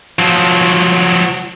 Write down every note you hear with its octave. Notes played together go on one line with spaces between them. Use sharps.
F3 F#3